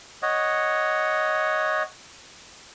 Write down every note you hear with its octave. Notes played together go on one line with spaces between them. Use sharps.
C#5 D#5 F#5